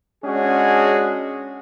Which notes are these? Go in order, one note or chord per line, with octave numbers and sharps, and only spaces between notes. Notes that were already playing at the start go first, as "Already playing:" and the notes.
G#3 C#4 D4 F#4 G#4